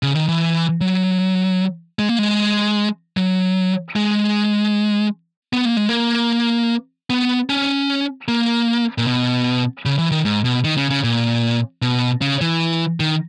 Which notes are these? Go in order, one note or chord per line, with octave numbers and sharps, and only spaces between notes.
C#3
D#3
E3
F#3
G#3
A#3
G#3
F#3
G#3
B3
A#3
G#3
A#3
B3
C#4
A#3
A#2
B2
C#3
E3
D#3
G#2
B2
D#3
C#3
C#3
A#2
B2
C#3
E3
D#3